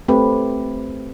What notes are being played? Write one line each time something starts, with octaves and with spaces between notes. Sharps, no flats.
A3 C4 G4 B4